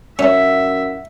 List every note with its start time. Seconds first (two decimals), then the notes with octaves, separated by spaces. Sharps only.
0.19 F#2 C#4 E4 E5 F#5